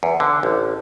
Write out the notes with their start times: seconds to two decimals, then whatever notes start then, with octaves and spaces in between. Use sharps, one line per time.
0.03 E2
0.20 D3
0.43 A1